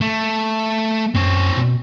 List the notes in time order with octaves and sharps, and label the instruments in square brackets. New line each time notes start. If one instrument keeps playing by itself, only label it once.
[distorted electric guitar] A3
[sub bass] F#2 [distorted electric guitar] C4 C#5
[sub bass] B2